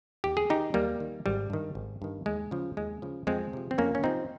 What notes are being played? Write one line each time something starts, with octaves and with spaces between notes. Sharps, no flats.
D#2 G4
G#4
D#3 D#4 G4
D#2 G3 A#3
D#3
G#1 G3
G2 D#3
G#1
G2 D#3
D#2 G#3
C#3 F3
D#2 G#3
C#3 F3
F2 G#3 C4
C3 F3
C4
F2 A#3 C#4
C#4
C3 F3 C4 D#4